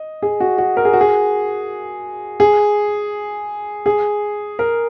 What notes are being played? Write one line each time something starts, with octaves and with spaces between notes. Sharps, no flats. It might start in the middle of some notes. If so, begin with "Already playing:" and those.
Already playing: D#5
G#4
F#4
F#4
A#4
G#4
F#4
G#4
G#4
G#4
A#4